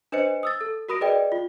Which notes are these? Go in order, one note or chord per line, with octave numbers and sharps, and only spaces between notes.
D4 B4 C5 D#5 C#7
D#6 E6 A6
A4
F#4 A#4 B5 D#6 A#6 D7
G#4 B4 D5 D#5 G5
F4